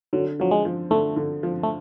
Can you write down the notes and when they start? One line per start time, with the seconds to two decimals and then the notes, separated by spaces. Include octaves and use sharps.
0.13 D3 F#3
0.40 F3 F#3
0.51 G#3
0.65 F3
0.91 D3 A3
1.16 D3
1.43 F3
1.63 A3